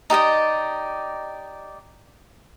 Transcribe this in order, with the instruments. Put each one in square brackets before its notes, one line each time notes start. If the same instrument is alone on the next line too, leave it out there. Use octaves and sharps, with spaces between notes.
[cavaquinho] D#4 G4 D5 D#5